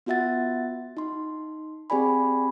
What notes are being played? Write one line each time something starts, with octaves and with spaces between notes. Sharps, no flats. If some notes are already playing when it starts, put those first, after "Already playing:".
B3 F4 F#4 E5 F#5 A6
D#4 C6
C4 G4 G#4 D5 G#5 B5